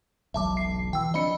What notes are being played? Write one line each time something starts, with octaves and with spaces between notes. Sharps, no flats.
E1 B1 F#3 E5 A5 D6
C7
E3 G5 E6
F3 C4 D4 D#5 B5 C#7